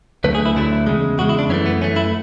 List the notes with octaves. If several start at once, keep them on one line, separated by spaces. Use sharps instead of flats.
D2 D3 F#3 A3 B4
G#4
E4
D2 D3 F#3 A3 E4
E2 C#3 G#3
E2 C#3 G#3 F#4
E4
D4
F#2 E3 A3 C#4
B3
F#2 E3 A3 C#4
E4